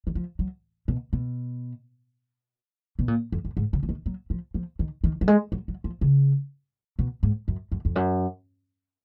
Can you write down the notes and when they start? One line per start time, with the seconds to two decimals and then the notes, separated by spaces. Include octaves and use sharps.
0.07 D#3
0.15 F3
0.39 F#3
0.88 B2
1.13 B2
2.99 B2
3.08 A#2
3.32 F2
3.45 F#2
3.57 G#2
3.73 C#3
3.83 F3
3.89 D#3
4.06 F#3
4.30 F3
4.54 F3
4.79 D#3
5.04 D#3
5.21 F#3
5.28 G#3
5.52 F#3
5.68 F#3
5.84 F3
6.01 C#3
6.99 B2
7.23 G#2
7.48 F#2
7.72 F#2
7.85 F2
7.96 F#2